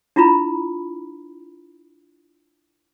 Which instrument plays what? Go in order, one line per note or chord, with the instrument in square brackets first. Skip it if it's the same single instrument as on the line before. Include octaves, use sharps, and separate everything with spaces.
[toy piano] D4 E4 F4 A#5 B5